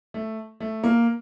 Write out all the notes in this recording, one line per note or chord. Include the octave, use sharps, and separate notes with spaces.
A3
A3
A#3